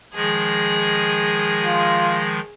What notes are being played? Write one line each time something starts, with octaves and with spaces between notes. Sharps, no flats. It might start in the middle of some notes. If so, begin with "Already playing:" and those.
D#3 F3 G#3 G#4
F4